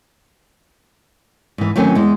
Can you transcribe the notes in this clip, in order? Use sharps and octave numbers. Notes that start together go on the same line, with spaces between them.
G#2 E3
D#3 E3 F#3 A3 C4 C#4
E2 G#3